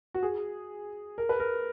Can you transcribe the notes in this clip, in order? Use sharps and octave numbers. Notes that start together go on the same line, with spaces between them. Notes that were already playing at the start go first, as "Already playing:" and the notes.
F#4
G#4
A#4
B4
A#4